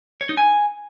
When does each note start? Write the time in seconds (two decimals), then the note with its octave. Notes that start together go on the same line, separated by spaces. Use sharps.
0.21 C#5
0.29 D#4
0.37 G#5